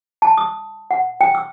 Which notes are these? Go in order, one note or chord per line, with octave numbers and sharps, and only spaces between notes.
A5
D#6
F#5
G5
E6